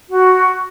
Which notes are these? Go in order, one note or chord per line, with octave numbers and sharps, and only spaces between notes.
F#4